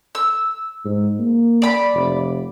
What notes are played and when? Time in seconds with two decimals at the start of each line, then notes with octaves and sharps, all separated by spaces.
0.15 E6
0.85 G#2
1.19 A#3
1.62 D5 B5
1.94 F1